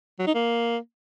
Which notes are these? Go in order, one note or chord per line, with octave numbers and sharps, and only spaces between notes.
F#3
D#4
A#3